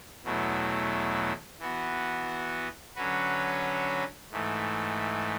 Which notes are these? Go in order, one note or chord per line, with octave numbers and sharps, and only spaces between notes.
E2 B2 F#3 A3 E4
E3 B3 F#4
D3 F#3 C#4 F#4 B4
G#2 E3 A3